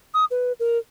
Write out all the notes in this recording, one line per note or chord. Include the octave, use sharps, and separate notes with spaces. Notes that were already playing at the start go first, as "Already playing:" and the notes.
D#6
B4
A#4